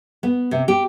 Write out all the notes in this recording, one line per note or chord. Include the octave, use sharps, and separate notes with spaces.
B3
C3
G4